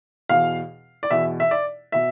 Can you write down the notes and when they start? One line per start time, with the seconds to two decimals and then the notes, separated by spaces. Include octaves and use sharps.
0.29 E2 B2 F5
1.03 D5
1.10 E2 B2 E5
1.40 E5
1.51 D5
1.92 B2 E5